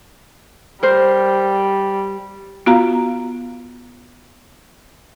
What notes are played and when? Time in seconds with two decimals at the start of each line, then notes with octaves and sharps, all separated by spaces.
0.83 G3 A#4 C5
2.66 B3 F4 F#4 F5 A#5